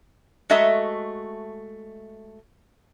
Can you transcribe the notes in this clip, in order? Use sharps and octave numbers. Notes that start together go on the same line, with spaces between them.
G#3 A3 F#4 D#5 E5 A#5